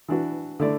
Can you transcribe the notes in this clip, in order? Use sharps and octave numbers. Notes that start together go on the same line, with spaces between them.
E3 D4 F#4
D3 A3 E4 D5